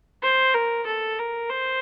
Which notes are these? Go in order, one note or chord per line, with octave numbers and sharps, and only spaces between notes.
C5
A#4
A4
A#4
C5